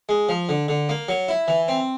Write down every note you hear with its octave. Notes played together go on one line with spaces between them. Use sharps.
G#3
F3
D3
D3
A#3
F#3
E4
E3
C4